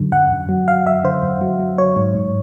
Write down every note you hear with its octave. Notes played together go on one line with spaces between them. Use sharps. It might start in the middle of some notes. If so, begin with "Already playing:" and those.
Already playing: F#2 D3 F#3
F#2 F#5
F#2
F#3
F#3 F5
F#2 E5
D3 C5
F#2
F#3
F#3
F#3 C#5
G#2
G#2